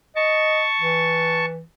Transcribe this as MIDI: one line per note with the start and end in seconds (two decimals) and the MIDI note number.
0.16 0.64 75
0.16 1.45 81
0.16 1.45 85
0.80 1.61 52